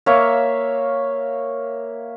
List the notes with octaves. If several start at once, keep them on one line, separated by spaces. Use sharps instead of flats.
A#3 C#5 E5 F5